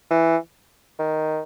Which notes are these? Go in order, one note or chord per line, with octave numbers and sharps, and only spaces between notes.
E3
D#3